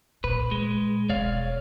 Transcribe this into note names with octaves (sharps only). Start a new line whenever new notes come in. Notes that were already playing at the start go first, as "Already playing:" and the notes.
A#2 B4
G#3
E1 C#5 D5 F5